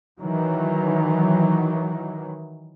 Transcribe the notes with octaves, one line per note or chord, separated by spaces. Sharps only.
D#3 E3 F#3